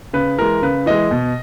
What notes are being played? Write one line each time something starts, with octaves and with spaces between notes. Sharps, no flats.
C#3 B4
E3 G#3 A#4
C#3 B4
E3 G#3 D#5
B2